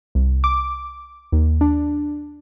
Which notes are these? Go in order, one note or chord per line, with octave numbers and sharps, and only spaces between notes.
C2
D6
D#2
D4